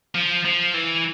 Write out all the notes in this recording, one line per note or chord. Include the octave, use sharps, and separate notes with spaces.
F3
F3
E3